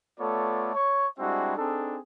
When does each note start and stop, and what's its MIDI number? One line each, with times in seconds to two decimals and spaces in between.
0.20 0.73 57
0.20 0.73 59
0.20 0.73 65
0.20 0.73 69
0.20 0.73 73
0.20 0.73 74
0.74 1.08 73
0.74 1.08 85
1.19 1.54 55
1.19 1.54 56
1.19 1.54 60
1.19 1.54 62
1.19 1.54 64
1.19 1.54 66
1.57 1.98 60
1.57 1.98 62
1.57 1.98 63
1.57 1.98 68
1.57 1.98 69